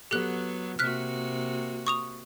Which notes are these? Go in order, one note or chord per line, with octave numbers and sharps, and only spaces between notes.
F#3 B3 G4 A4 F#6
C3 A#3 F#4 F6 F#6 B6
C#6 D#6 F7